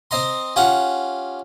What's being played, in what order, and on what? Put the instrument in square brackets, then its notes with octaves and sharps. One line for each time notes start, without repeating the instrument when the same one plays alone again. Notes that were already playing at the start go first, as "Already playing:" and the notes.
[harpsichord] C4 C5 D#5 A#5 C6
C#4 F4 G4 F#5